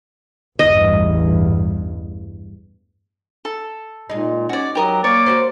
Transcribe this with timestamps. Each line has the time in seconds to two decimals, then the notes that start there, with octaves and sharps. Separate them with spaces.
0.59 A1 E2 G2 D#5
3.45 A4
4.10 A#2 G#3 D#4
4.49 C#4 F#4 D5
4.75 F#3 G4 A#4 D#6
5.04 A#3 C#5 D5
5.26 F#4 G4 C5